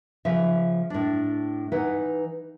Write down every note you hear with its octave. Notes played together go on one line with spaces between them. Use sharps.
C#3 F3 E5
A2 D4
E3 D#4 B4 F#5